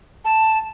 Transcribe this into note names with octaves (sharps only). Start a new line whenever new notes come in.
A5